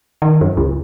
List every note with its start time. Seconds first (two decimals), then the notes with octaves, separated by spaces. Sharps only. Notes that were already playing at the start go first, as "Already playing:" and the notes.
0.22 D#3
0.41 F#2
0.57 C#2